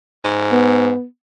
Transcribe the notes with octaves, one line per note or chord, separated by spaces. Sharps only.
G#2
B3